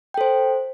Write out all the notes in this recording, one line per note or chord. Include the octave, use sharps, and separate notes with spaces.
A4 C5 G5